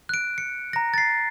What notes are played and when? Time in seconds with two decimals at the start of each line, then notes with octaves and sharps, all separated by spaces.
0.09 F#6 D7
0.38 C#7
0.73 A#5 A#6
0.94 A6 C7